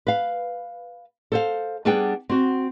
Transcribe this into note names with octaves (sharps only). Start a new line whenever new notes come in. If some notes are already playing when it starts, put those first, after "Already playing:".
B4 F5
A4 C5 F5
G3 B3 D4 G#4 G5
C4 F#4